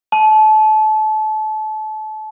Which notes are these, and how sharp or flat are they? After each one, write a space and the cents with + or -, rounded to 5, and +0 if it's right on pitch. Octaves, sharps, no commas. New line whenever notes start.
A5 -30